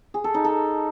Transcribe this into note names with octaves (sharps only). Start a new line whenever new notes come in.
G#4
A4
D#4
A4